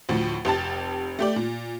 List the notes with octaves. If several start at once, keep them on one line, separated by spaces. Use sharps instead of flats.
D2 A2 F3
F1 G4 A5 A6
A3 G4 D5
A#2